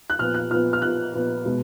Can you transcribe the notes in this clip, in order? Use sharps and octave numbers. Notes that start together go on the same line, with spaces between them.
F#6
A#2 F3 B3 F6
F#6
A#2 F3 B3 F6
F6
A#2 F3 B3 F#6
A#2 F3 B3
B2 G#3 B3